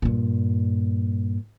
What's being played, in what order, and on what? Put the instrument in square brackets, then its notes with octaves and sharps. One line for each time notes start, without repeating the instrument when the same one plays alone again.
[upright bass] G2 A#2